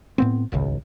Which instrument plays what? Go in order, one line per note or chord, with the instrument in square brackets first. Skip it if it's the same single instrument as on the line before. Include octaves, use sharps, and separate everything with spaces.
[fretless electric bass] A2 B3 C4
D#1 G#1 C#2 C#3